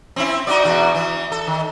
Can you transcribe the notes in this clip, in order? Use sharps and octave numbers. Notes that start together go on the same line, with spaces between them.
C4 C#4 E4
D#4 F#4 D5
E2 B2 F#4
E3
A4
D#3